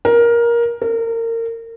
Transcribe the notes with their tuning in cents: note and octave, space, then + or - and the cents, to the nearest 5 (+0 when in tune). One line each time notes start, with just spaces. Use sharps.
A#4 +15
A#4 -30